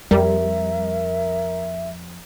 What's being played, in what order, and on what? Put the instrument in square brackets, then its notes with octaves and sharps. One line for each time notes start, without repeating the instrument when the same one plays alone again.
[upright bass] F2 [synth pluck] G3 [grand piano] A#4 [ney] E5